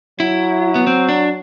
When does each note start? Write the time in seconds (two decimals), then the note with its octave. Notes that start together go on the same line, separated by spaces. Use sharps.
0.19 F#3 E4
0.75 B3
0.87 C4
1.09 D4